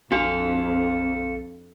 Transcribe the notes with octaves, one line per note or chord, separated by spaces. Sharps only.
A#1 F2 D4 F#4 A4 F5